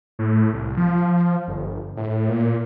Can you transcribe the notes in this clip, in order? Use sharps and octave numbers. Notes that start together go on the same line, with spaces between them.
A2
C2
F3
G1
A2
A#2